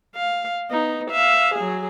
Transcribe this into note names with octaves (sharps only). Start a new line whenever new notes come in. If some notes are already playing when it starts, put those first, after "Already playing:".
F5
B3 D#4
E5 F5
F#3 G#4